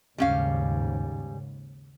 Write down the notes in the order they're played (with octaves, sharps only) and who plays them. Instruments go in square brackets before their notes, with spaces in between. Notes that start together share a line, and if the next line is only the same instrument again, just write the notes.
[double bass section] D#2 G#2 C#3 [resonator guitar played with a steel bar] G3 C#4 F5